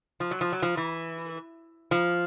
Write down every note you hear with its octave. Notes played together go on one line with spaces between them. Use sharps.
F3
F#3
F3
F#3
F3
E3
F3